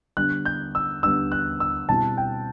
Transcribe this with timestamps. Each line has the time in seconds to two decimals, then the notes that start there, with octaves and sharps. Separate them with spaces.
0.17 D3 G3 B3 D4 F#6
0.45 G6
0.75 E6
1.03 D3 G3 B3 D4 E6
1.32 F#6
1.60 E6
1.89 B2 G3 C4 E4 A5
2.17 G5